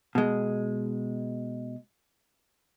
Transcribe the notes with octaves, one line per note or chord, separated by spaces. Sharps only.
B2 G#3